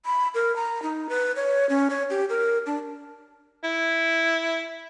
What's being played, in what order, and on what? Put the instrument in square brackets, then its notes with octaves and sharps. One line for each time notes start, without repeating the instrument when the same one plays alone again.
[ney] B5
A#4
A#5
D#4
B4
C#5
C#4
C#5
G4
A#4
D4
[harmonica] E4